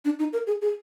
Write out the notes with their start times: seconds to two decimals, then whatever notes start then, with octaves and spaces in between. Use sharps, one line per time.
0.05 D4
0.19 D#4
0.33 A#4
0.47 G#4
0.62 G#4